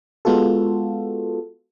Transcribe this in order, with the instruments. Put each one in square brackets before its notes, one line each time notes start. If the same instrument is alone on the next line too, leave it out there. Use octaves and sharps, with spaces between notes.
[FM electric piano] G#3 B3 F4 F#4 A4